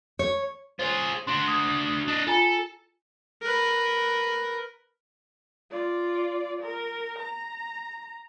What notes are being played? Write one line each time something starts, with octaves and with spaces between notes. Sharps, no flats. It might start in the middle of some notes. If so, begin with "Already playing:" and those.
C#5
F4 G#4 C5 C#5
D4 F#4 C6
D#6 G#6
D4 D#5
F4 A4 G#5 A#5
A#4 B4
F4 D5
A#4
A#5